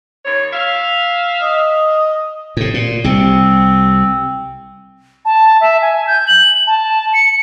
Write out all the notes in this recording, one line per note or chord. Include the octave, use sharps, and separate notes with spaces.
D#2 C#5
E5 F5
D#5
A2 C3
A#2
C2 C3 C4
A5
E5
G#5
G6
F#7
A5
C#7